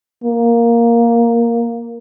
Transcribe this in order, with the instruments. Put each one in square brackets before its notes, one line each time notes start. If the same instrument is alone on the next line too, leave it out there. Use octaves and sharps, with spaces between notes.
[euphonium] A#3